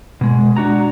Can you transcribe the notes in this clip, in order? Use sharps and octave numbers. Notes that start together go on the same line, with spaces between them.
B2 G#3
D4 F#4 A#5